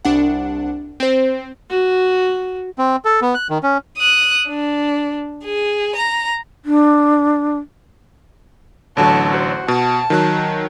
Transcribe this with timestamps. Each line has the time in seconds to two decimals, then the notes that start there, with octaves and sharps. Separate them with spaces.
0.05 C2 D4 F#5
1.00 C4 C5
1.70 F#4
2.78 C4
3.05 A4
3.22 B3
3.35 F#6
3.50 D#3
3.63 C#4
3.98 D#6 F#6
4.48 D4
5.44 G#4
5.95 A#5
6.65 D4
8.97 A1 D3 F#3 F#4 A5
9.30 F#4 C5
9.68 B2 A5
10.10 D#3 F#3 F#6